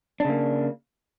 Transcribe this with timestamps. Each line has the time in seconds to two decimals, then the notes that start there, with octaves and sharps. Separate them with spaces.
0.20 D4
0.25 C#3
0.30 A#3